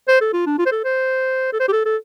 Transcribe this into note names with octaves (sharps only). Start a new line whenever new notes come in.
C5
A4
F4
D4
F4
C5
A4
C5
A4
C5
G4
A4
A4